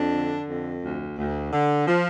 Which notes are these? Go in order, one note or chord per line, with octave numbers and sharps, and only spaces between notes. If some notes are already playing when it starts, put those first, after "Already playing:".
Already playing: F2 D4
D3
F2
D2
D2
D3
F3